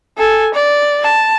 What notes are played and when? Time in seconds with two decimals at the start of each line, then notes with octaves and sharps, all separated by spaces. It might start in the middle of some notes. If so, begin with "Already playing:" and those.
0.18 A4 G#5
0.54 D5
1.03 A5